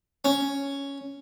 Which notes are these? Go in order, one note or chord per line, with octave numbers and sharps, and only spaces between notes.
C#4